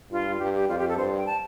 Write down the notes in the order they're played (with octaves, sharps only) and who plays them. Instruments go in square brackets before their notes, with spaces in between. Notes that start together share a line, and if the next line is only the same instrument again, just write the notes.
[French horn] G2 [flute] F4
[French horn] G2 [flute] G4
[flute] G4
[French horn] F2 [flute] F4
[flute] G4
A4
[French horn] G2 [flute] C5
[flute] G5
A5